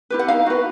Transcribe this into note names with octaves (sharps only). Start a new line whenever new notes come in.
E4 G4 B4
F#5
D#4 F5
F#4 B4